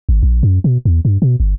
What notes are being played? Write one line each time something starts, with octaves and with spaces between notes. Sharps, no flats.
G#1
A#1
F#2
B2
E2
G2
B2
G1